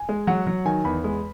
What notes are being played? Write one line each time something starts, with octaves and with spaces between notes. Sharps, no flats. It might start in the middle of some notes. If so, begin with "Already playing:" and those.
Already playing: G#5
G#3
F#3 F#5
F#3
D#3 G#5
E2 B5
G#3